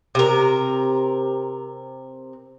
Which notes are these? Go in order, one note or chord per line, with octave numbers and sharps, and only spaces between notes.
C3 A#4